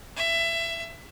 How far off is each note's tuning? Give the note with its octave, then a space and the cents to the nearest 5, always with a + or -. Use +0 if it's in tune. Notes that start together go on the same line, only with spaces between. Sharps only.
E5 +20